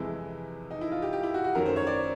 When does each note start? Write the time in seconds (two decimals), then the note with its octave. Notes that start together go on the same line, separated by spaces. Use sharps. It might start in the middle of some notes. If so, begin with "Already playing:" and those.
Already playing: F2 C3 E3 G#3 E4
0.71 D#4
0.81 E4
0.92 F4
1.02 G4
1.13 G4
1.23 E4
1.34 F#4
1.44 F#4
1.55 F#2 D#3 F#3 A3 A#4
1.66 C5
1.76 C#5
1.87 D5